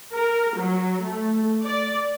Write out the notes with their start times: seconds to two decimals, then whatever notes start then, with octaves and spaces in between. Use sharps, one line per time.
0.14 A#4
0.56 F#3
1.02 A3
1.63 D5